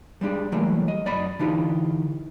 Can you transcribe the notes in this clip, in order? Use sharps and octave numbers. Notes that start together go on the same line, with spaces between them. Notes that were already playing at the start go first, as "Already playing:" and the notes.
G3 G#3 D4 G4
E3 F#3 G3 A3 A#3
D#5
F#2 D5 D#5 B5
D3 E3 D#4 F4 G4